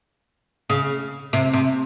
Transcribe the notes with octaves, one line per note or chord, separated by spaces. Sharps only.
C#3
C3
C3